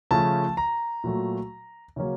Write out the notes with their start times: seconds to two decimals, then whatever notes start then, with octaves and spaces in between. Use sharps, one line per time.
0.11 C#3 F3 A3 C#4 A5
0.57 A#5
1.04 A#2 F#3 A3
1.96 C#3 F#3 A#3 C#4